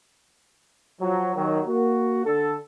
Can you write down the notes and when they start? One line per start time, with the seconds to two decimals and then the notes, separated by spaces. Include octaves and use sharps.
1.01 F3 F#3
1.35 D#2 D#3 F#3
1.67 A#3 F#4
2.25 D3 A4